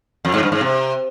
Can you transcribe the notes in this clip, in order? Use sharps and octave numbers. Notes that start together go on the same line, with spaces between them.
F2
G#2
G2
G#2
C3